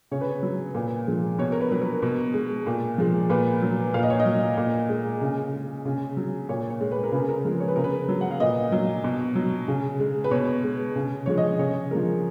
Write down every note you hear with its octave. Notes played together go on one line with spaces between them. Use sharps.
C#3 C#5
B4
C#5
F#3
A#2
F3 G#3
B2 C#5
A#4
B4
F#3 B4
A#4
B2
G#3
A#2
F3 G#3
A#2 B4
F#3
A#2 F5
D#5
C#5
D#5
F#3
A#2
G#3
C#3
G#3
C#3
F#3
A#2 C#5
C#5
G#3
B4
A#4
C#3 B4
A#4
F3 G#3
C#5
B4
C#3 A#4
B4
F#3
F#5
F5
A#2 D#5
F#3
B2
F#3
C#3
G#3
B4
B2 C#5
G#3
C#3
F3 G#3 C#5
D#5
C#3 C#5
F3 G#3 A#4